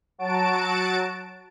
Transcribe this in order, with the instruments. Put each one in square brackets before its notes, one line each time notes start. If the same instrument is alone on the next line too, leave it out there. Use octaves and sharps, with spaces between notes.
[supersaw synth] F#3 F#4 A5 D7